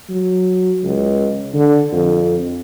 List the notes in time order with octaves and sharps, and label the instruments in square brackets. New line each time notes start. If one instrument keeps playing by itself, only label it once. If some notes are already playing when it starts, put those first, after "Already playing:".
[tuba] F#3
C#2
D3
F2